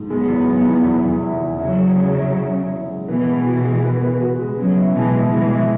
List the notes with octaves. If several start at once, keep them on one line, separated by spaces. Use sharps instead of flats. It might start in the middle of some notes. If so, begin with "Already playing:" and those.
Already playing: G#2
F#3 G#3 B3
E2
G#3
E3
E2
E3
E4
E2
C#3 F#3 E5
G#4
G#3
E5
E4
E4
E4
G#3
B2 E3 B4
G#3
F#4
G#3
B4
B4
F#4
G#3
C#3 F#3 B3
E4
B2 E3 G#3
E4
B2 E3 G#3
E4